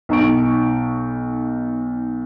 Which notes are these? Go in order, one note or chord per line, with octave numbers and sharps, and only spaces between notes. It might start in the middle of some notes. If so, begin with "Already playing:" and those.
B1 D#4 C#6 D7